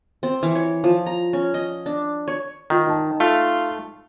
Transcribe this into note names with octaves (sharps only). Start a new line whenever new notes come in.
C4
E3
C#5
F3
A#5
C#4
D#5
D4
C#5
D#3 F4
D#4 A5
A3 F4